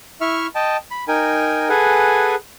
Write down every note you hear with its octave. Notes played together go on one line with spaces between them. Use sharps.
E4 E5 C#6 F6
D#5 G5 A5
B5
D#4 A#4 G5 G#5
G#4 A4 B4 F#5 G#5